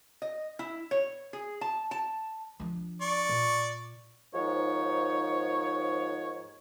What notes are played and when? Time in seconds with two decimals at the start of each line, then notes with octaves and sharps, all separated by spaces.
0.22 D#5
0.59 E4
0.91 C#5
1.33 G#4
1.61 A5
1.91 A5
2.60 F3 D4
3.01 D5 C#6
3.29 A#2
4.34 D#2 G#2 F3 D#4 C#5